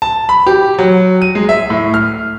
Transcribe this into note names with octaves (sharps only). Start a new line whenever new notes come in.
A5
B5
G4
F#3
D#7
G#3
E5
A2
F6